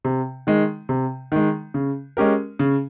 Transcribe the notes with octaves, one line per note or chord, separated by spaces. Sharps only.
C3
D#3 G#3
C3
D#3 G#3
C#3
G#3 C#4 G4 A#4
C#3